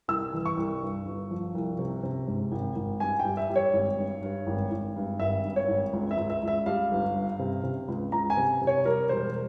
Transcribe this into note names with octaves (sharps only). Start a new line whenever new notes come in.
C2 E6
E3
C#6
C2
G2
G1
F3
C2
C3
C3
G#2
G#1
G#1
G2 G#5
G3 G5
E5
G3
C#5
G#1
G2
G2
G#1
G#1
G2
G#1 E5
G2
C#5
G#1
C#2
E5
C#2
E5
C#2
E5
G3 F5
G1
G2
C3
C3
C#2
C#2 A#5
G#5
C3
C3
C#5
G3 A#4
E1 C5